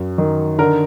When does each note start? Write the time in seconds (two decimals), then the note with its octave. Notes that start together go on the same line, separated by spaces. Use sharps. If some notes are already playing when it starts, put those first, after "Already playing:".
Already playing: F#2
0.18 D#3
0.58 D3 A#4